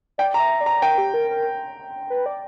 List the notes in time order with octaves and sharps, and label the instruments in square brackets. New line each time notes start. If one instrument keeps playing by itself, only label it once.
[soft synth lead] D5 [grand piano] G5
[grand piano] A#5
[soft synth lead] E5
D5
[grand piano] A#5
[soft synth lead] A#4 [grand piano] G5
[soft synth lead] G4
A#4
A#4
B4
D5